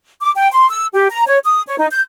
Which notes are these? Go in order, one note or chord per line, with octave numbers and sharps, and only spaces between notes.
D6
G5
C6
E6
G4
A#5
C#5
D#6
C#5
D#4
G6